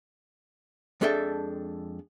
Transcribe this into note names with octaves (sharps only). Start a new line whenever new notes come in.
F2 G#3 D4 A4 E5 G5